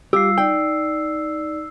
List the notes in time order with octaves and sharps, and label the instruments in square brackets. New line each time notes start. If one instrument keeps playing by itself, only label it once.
[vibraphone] G3 F4 F5 [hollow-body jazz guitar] G4 [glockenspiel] E6 C7
[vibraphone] D#4 D5 [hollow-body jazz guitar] G5